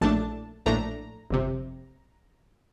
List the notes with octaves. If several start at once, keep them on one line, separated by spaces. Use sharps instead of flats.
A#1 A2 A3 D4 A5
A#1 A2 A3 D4 A#5
G1 F2 C3